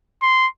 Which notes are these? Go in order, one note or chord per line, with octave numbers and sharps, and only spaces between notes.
C6